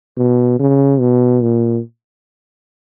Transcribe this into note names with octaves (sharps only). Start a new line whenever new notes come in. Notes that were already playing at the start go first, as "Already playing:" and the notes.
B2
C#3
B2
A#2